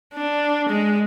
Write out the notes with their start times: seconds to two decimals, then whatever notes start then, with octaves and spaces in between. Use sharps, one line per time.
0.14 D4
0.69 G#3